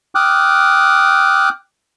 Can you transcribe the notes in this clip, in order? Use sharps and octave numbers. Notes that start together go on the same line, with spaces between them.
G5 D6 D#6 F6 F#6